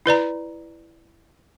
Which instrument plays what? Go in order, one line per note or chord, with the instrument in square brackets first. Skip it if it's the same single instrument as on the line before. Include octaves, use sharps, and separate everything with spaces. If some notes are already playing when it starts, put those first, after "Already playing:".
[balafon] E4 B4 D5 A#5